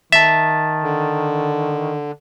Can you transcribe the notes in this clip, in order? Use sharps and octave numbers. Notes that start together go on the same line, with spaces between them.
D#3 E5 A5 A6
D3